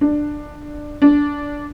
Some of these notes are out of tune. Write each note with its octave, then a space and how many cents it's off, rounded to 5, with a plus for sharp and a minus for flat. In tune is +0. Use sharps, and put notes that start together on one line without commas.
D4 +10
D4 -15